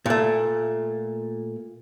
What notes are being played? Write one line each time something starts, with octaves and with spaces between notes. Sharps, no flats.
A#2 A3